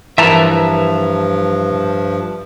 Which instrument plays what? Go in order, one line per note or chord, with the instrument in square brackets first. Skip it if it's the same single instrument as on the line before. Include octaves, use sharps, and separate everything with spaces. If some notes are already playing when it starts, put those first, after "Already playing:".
[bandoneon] G2 F3 [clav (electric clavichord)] E3 A#4 B4 [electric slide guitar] E5 A5 A#5